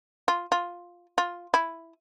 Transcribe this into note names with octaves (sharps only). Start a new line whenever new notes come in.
F4
F4
F4
E4